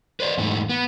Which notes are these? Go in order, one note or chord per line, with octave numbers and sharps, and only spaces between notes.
B4 C5 D5
E2 G#2 A3
B3